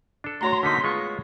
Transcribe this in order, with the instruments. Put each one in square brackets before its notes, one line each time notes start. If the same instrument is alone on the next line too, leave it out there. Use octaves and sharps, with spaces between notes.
[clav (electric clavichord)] D4 A4
[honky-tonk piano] A2 F#4 C#5 [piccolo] A#5 [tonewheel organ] C6
[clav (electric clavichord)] D3 A#3 D#4 [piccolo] B6
[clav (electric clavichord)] G#3 B3 F4 [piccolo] C#6